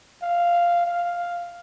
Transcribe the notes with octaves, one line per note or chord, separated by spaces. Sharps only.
F5
F5